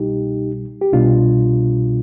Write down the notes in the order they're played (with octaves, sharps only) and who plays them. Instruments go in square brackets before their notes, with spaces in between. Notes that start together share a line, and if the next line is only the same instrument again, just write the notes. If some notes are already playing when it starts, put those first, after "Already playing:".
Already playing: [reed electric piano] C2 B2 G3 D#4 G4
G4
C2 B2 G3 D4 F4